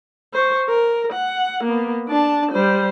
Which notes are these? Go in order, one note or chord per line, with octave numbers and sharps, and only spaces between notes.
C5 C#6
A#4
F#5
A#3 B3
D4 A5
G3 C5